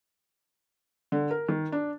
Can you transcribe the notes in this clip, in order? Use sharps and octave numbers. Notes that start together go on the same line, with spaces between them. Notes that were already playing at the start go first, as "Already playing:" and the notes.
D3
A#4
D#3
D4